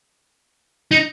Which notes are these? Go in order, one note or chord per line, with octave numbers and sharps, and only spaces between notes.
D#4